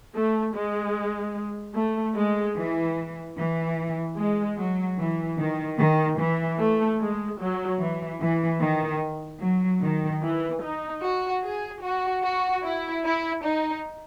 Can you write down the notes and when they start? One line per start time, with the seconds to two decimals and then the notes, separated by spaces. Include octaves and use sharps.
0.14 A3
0.54 G#3
1.75 A3
2.16 G#3
2.56 E3
3.37 E3
4.17 G#3
4.57 F#3
4.98 E3
5.38 D#3
5.78 D#3
6.18 E3
6.58 A3
7.00 G#3
7.39 F#3
7.79 E3
8.20 E3
8.60 D#3
9.41 F#3
9.81 D#3
10.22 E3
10.61 D#4
11.02 F#4
11.42 G#4
11.82 F#4
12.23 F#4
12.63 E4
13.04 E4
13.44 D#4